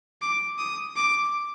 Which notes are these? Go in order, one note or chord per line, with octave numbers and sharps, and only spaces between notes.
D6
D#6
D6